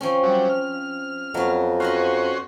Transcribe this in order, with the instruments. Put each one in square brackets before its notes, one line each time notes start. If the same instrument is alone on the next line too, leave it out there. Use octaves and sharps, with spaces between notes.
[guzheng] F3 C4 C#4
[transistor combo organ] F#3 G3
F6
[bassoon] F2 [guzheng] F#3 B3
[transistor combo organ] C#4 F#4 C5 [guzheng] B4 D#5 F5